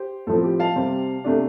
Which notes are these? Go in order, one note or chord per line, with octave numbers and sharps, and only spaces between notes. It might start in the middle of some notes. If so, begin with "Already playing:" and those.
Already playing: G4 C5
A2 F3 C4 A4
G4
F5 A5
C3 G3 C4
C3 A3 D4